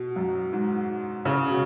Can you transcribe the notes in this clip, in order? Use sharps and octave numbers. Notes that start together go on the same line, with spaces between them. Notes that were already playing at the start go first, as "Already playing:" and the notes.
Already playing: B2
F#2
G#2
C#3
B2